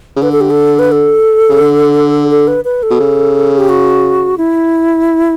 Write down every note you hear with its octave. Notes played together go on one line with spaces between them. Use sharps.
C#3
D3 B4
A4
G4
A4
B4
A4
C#3
D3
A4
B4
B4
A4
B2
C#3
G4
F#4
E4